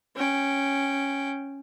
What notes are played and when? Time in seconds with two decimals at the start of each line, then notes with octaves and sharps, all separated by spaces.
0.16 C#4 G5